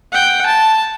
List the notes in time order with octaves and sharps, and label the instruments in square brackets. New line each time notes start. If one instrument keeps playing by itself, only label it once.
[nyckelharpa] F#5 G5
A5